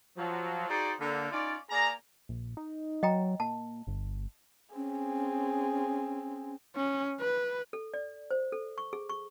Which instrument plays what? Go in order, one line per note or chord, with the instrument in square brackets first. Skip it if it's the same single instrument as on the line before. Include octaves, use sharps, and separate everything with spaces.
[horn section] F3 F#3
D#4 F#4 G#4 C5 D5
D3 A#3
C#4 D#4 F4 D5
A#3 G#4 D5 A#5
[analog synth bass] A#1
D#4
[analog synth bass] F#3 [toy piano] D#5 G5 A#5
[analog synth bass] A#2 [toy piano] A5
[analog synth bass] G1
[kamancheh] C4 G#4 [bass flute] C#4
[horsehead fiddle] C#4
B4
[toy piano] A4
D5
C5
A4
C#6
G#4
C#6